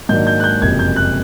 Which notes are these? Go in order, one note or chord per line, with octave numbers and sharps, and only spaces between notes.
G#2 D#3 F#3 A#3 D4 G6
G6
F#6
G6
F#1 F2 C3 G#6
G6
F#6